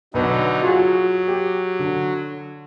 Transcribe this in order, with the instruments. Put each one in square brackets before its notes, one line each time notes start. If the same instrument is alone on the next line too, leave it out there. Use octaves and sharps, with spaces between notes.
[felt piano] B1 B4 [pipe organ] D3 F#3 D#4
[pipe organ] F#3 [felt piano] F4 F#4 G#4
[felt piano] G4
D3